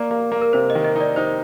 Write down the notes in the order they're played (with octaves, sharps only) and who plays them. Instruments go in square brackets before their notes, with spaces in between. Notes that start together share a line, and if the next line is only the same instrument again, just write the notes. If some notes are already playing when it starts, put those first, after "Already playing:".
Already playing: [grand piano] A#3 [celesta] D5
[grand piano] A#3
A#3
[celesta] A#4
[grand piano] C3 [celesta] C5
[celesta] D#5
[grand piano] D#3
[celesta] D#5
[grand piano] D#4 [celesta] D5
[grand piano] D#4 [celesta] C5